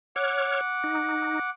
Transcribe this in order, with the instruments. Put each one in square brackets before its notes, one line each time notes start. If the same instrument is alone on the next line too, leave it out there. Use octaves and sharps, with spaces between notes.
[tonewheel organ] C#5 F6 [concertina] F#5 D6
[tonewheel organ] D#4